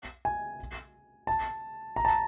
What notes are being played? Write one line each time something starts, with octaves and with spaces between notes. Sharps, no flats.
G#5
A5
A#5
A5